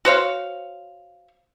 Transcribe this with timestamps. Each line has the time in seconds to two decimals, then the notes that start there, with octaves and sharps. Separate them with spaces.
0.05 F#4 C5 C#5 F5